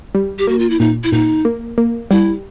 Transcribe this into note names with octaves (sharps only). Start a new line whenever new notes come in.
G3
G4
A#3 F#4
F4
E4
A#2 D#4
E4
A#2 D#4
A#3
A#3
G3 E4